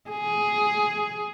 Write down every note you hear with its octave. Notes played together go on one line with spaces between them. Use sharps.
G#4